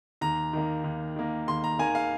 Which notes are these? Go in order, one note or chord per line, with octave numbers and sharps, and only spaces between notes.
D#2 A#5
D#3 A#3
D#2
D#3 A#3
D#2 C6
A#5
D#3 A#3 G#5
F5